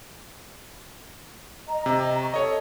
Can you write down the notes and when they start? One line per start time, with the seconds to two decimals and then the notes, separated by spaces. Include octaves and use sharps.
1.68 D#5 A#5
1.86 C3
2.19 C#6
2.34 A4 C#5 D#5